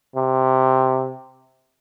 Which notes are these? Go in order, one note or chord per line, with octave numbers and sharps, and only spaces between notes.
C3